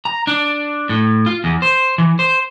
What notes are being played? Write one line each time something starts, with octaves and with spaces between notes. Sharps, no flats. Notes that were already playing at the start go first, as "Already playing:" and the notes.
A#5
D4
A2
F4
E2
C5
E3
C5